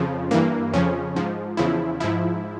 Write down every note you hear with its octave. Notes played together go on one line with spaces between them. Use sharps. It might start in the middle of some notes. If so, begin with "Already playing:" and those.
Already playing: F2 C#3 F3
G2 E3 A#3
F2 C#3 F3 C#4
G#2 F3
E2 C#3 F3 E4
G#2 F3 E4